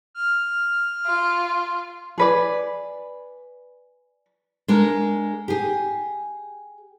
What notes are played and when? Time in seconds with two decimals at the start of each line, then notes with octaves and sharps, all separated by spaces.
0.15 F6
1.06 F4
2.18 G#4 B4 D5
4.68 G#3 D4 A#4
5.48 G4 G#4